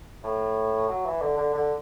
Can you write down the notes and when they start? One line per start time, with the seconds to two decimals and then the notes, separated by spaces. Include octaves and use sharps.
0.24 A2
0.89 F#3
1.05 E3
1.21 D3
1.37 D3
1.54 D3